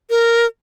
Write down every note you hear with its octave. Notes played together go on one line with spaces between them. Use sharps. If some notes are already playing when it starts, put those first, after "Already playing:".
A#4